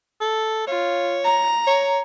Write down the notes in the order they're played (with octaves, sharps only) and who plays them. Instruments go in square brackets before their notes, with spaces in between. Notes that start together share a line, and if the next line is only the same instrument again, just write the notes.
[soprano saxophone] A4
[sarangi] F4 [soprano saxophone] C#5
[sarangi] A#5
[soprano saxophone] C#5